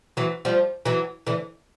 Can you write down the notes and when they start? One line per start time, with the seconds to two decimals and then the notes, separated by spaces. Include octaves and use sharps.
0.17 E3 F#3
0.45 F3 G3
0.85 E3 F#3
1.27 D3 E3